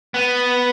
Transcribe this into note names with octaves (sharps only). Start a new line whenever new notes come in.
B3